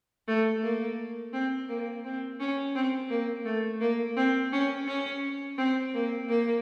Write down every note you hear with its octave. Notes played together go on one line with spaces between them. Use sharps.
A3
A#3
C4
A#3
C4
C#4
C4
A#3
A3
A#3
C4
C#4
C#4
C4
A#3
A#3